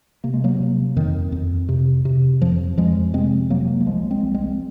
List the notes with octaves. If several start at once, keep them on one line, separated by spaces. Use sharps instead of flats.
C3 A#3
G#3
F#3 A#3
C3
F2 D#3
F2
C3
C3
F2 F3
F2 F3 G#3
C3 G#3 C4
C3 F#3 A#3
A#3
C2 F3 G#3
G#3 C4
C2
G#3 C4